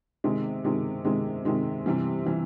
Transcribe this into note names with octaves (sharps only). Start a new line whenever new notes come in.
C3 D#3 G#3
C3 D#3 G#3
C3 D#3 G#3
C3 D#3 G#3
C3 E3 G3
C3 E3 G3